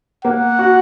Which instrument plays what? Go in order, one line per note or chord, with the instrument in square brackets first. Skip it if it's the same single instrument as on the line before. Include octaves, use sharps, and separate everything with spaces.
[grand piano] A#3 [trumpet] F#5
[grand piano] F#4